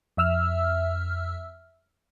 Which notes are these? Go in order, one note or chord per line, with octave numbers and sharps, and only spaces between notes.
F2 E5 E6 F6